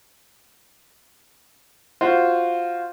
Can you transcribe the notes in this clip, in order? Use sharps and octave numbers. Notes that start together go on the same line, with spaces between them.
F4 F#4 C5